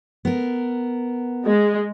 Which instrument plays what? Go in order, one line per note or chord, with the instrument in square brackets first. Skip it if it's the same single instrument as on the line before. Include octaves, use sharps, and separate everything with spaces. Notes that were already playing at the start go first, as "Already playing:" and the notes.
[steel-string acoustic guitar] B3 A#4
[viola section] G#3